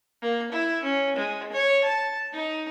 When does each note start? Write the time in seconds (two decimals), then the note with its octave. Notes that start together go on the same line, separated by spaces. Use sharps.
0.22 A#3
0.52 E4
0.84 C#4
1.16 G#3
1.53 C#5
1.84 A5
2.33 D#4